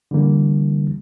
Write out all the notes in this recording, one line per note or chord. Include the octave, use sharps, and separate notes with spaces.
D3 E3 G3 A#3